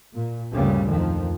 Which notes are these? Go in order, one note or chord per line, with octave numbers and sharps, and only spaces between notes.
A#2
D2 G2 A#2 C#3 G3
F2 D#3 F3